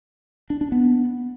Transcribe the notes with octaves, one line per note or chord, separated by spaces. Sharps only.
D4
D4
B3